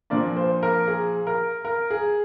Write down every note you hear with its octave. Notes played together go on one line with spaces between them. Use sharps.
A#2 F3 A#3 D4 D5
C5
A#4
G#4
A#4
A#4
G#4